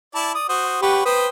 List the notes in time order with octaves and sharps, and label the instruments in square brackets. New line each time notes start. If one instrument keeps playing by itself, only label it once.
[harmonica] E4 D5 A5
D5 D#6
F#4 C5 D#6
[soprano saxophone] G4 [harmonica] B4 C#5 F#5
[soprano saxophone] B4 [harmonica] C5 G5 D#6